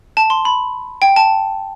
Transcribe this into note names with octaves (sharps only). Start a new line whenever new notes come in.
A5
C6
B5
G5
A5